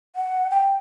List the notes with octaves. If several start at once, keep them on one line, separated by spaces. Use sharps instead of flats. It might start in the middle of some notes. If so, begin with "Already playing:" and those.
F#5
G5